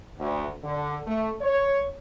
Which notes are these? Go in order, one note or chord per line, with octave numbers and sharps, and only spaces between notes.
D2
D3
A3
C#5